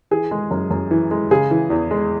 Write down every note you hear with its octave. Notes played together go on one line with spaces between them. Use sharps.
E3 G#4
G#3
F#2
F#2
E3
G#3
C#3 G#4
E3
E2
G#3